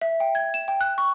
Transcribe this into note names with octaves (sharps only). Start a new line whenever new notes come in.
E5
G5
G#6
E7
G5
F#6
C#6